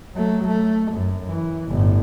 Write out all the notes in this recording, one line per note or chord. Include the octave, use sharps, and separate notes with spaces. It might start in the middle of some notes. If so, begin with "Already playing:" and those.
F#3 A3
A3
F#2
E3
G1 A2